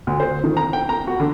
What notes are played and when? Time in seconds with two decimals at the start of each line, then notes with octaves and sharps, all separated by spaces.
0.07 D2
0.20 C5
0.44 D#3
0.57 A#5
0.73 G5
0.89 A#5
1.07 F#4
1.20 D3